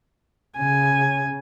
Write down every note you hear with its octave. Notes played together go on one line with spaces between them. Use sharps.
C#3 G#5